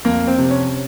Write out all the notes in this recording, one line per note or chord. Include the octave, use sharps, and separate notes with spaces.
F2 A#3
C4
C3
C#4